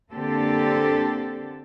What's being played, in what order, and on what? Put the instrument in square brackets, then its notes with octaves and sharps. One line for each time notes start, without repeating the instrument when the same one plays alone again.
[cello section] D3 A#3 C4 D4 G4 A4